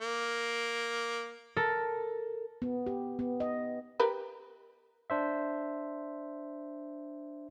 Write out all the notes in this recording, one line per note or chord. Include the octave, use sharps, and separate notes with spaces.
A#3
A4 A#4
B3
G4
B3
D#5
G4 A#4 B4
D4 C5 E5